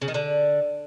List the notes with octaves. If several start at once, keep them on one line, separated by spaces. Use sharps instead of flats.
C#3
D#3
D3